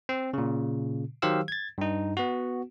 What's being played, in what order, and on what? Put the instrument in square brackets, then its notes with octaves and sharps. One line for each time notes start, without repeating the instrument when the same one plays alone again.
[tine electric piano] C4
A#2 C#3
D#3 F#3 G4 C5 F5 E6
G#6 A6
G2 D#4
B3 F#4